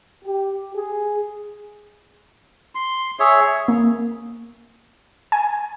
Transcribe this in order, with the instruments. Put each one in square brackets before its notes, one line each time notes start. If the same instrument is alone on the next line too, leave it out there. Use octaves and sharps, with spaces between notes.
[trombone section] G4
G#4
[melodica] C6
G#4 C#5 E5
[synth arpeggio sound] A#3
G#5